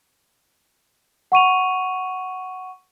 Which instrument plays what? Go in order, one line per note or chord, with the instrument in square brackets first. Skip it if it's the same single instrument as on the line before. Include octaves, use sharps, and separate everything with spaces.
[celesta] F#5 C#6 D#7 F7